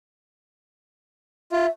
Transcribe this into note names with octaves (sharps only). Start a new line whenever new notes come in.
F4 E5